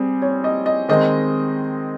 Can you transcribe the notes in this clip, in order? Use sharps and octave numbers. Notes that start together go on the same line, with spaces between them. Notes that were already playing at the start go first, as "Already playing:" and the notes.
Already playing: G3 C4 G#4
C#5
D#5
D#5
D#3 G#3 C4 D#5